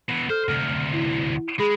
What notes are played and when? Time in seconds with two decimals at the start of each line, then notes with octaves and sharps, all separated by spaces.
0.09 B2 E3
0.30 A4 C5 F6
0.49 D2 C3 F6
0.93 E4
1.59 G#3 G#4 B5